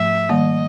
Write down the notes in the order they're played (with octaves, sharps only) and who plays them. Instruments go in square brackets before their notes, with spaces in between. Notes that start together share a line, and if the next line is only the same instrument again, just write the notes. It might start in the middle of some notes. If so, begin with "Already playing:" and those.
Already playing: [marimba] G#2 F3 A3 [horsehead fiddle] E5
[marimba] D#3 G3 A#3 [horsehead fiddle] D#5